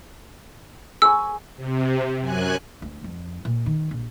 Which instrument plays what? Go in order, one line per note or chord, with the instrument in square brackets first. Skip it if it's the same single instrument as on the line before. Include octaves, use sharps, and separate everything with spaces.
[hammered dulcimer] G#4 B5 C#6 [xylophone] E6
[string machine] C3
F#2 G#5 F#6
[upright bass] D2
F2
A#2
D#3
A#1